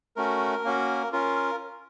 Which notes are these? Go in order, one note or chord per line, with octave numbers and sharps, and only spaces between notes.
A3 C#4 F#4 A#4
A#3 C#4 F#4
C#4 F4 A#4